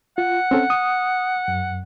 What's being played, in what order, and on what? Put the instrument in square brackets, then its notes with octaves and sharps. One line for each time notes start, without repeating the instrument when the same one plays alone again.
[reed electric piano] F4 [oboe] F#5
[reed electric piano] C4 C#4 A4
D#6
F#2